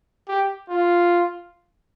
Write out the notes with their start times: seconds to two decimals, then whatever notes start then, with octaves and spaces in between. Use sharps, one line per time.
0.28 G4
0.69 F4